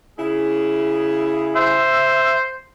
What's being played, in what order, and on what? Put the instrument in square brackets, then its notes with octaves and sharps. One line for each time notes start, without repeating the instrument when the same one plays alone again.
[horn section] C#3 E4 G#4
[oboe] C5 [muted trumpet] E5